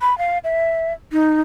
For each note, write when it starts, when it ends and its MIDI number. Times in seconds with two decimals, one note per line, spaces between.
0.01 0.17 83
0.18 0.38 77
0.44 0.93 76
1.12 1.41 63